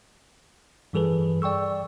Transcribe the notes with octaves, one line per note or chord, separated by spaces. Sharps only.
G2 E3 G3 G#4 A4 B4
D5 G5 C#6 E6